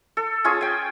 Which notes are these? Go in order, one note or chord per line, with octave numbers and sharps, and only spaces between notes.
A4
C#4 F4 G#4 G#5
G5 G#5